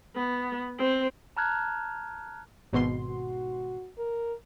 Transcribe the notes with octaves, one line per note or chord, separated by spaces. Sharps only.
B3
C4
A5 A#5 F6 F#6 G#6
G#1 B2 C6
F#4
A#4